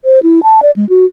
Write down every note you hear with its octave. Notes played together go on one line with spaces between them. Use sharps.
C5
E4
A5
D5
G#3
F#4